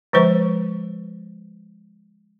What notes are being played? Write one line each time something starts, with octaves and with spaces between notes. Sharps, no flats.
D3 F3 G#3 B4 C5